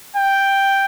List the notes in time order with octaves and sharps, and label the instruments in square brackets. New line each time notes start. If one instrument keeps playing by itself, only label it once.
[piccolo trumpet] G5